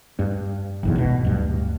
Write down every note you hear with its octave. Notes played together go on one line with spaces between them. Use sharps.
G2
F#1 B1 E2
G#1 B2
D1 G2